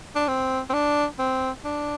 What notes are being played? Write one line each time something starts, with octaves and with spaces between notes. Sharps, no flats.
D4
C4
C4
D4
C4
D4